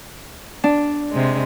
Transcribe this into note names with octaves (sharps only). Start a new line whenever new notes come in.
D4
C3 G#3